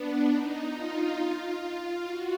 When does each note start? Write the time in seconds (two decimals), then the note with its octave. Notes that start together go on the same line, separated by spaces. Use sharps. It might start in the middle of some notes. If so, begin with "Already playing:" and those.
Already playing: B3 D4
0.29 D#4
0.72 F4
2.06 F#4